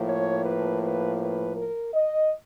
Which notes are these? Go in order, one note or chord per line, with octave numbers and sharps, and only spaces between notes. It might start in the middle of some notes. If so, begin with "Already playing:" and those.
Already playing: A2 F3 A#3
C#5
B4
B4
B4
A#4
D#5